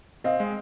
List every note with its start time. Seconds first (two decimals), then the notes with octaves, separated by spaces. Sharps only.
0.24 C4 D#5 F5
0.40 G#3